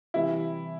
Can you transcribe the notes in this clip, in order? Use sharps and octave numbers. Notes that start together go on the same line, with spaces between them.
C3 E3 G3 E4